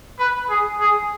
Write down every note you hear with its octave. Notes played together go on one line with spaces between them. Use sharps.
B4
G#4
G#4